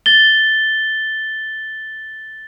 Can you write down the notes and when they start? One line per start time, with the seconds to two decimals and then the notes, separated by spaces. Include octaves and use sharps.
0.06 A6 G7